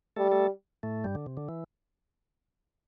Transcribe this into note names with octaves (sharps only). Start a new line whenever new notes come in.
G3 A3 A4
A3 A4
A2 A3
G2 G3
D3
C3
D3
E3